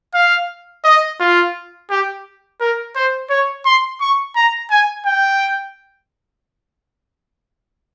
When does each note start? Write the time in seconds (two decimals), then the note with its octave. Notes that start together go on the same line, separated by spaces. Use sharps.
0.15 F5
0.85 D#5
1.20 F4
1.90 G4
2.61 A#4
2.96 C5
3.30 C#5
3.65 C6
4.01 C#6
4.36 A#5
4.71 G#5
5.06 G5